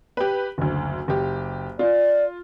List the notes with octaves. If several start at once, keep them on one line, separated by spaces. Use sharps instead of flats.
G4 B4
F#1 D2
F#1 G4
F4 D5